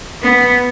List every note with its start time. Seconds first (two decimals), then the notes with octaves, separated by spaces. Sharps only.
0.23 B3